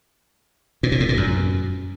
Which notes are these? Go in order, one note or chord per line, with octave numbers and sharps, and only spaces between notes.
A#2
B2
A2
A#2
F#2